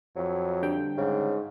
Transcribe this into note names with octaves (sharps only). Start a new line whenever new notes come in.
F2 F#3
D3 G3 G5
G#2 C#3